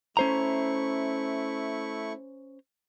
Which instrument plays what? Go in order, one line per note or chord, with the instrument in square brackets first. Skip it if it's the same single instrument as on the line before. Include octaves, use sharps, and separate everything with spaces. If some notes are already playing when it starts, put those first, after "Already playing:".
[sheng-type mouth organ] A3 E4 C#6 [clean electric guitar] C#4 C5 A#5